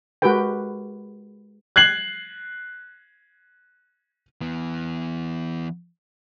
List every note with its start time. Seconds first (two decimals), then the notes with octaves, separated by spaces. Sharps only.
0.22 G#3 F#4 G4 A#4 B4 G5
1.76 F#6 G#6 C7 F#7
4.41 E3 B3